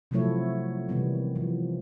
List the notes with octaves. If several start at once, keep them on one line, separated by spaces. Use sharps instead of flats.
C3 F3 F#3 A3 E4 C#5
C3 D#3 E3 G3 B3
E3 F3